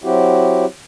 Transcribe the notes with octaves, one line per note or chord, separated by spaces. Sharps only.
F#3 C4 E4 F#4 G4